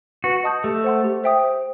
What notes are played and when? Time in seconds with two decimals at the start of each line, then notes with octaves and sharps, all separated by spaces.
0.24 F#4 B4
0.44 D#5 A5 D#6 G6
0.64 A3 G4
0.84 C5 F#5 C6
1.04 G4
1.24 C5 E5 G5 D#6
1.44 C5